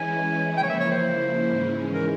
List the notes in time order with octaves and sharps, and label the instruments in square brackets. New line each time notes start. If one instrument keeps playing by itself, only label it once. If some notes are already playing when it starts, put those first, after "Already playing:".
Already playing: [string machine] E3 G#3 C#4 E4 [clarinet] G#5
[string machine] C#3 F3 A#3 E4 [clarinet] G5
[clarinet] C#5
E5
C#5
C5
[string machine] G#2 E3 G#3 C#4
[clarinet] A#4